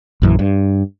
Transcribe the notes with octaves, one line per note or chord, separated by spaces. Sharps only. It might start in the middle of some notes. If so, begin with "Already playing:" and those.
A#1 F#2 E3
G2